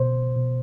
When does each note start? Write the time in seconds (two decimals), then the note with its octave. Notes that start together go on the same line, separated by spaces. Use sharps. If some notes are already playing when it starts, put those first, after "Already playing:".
Already playing: B2 C5
0.36 B2